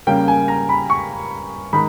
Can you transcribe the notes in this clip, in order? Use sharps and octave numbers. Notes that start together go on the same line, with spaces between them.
C#3 G3 A#3 C#4 G5
G#5
A#5
B5
C#6
D#3 G#3 D#4 B5